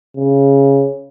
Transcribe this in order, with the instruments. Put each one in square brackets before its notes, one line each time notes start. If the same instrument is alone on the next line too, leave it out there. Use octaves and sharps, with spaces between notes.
[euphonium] C#3